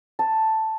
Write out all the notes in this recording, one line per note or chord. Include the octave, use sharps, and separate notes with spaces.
A5